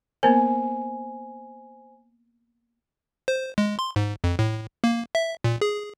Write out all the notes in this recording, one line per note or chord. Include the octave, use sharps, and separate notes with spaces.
A#3 B3 A#4 C5 G#5
C5
G#3
C6
G#2
F2
A2
A#3
E5
A#2
G#4